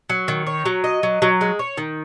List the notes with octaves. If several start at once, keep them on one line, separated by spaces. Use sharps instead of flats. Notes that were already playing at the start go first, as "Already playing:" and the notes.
F#3
D#3
C#5
F#3
D#5
F#3
F#3
G#3
C#5
D#3